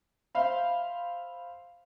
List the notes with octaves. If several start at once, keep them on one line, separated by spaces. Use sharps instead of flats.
C5 E5 F5 B5